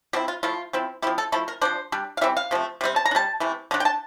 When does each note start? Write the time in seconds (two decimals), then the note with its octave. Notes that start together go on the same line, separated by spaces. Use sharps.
0.13 F3 C4 E4 G4
0.28 F4
0.43 F3 A3 E4 F4
0.73 F3 C4 E4
1.02 F3 C4 E4 G4
1.18 A4
1.32 F3 A3 E4 A4
1.48 A#4
1.61 F3 A#3 D4 C5
1.92 G3 D4
2.17 F5
2.21 E3 G3 C4 E5
2.37 F5
2.51 C3 F3 A3
2.81 C3 G3 C4
2.96 A5
3.05 A#5
3.11 D4
3.15 G3 A5
3.40 C3 E3 A3
3.71 D3 A3 D4 A#5
3.80 G5
3.85 A5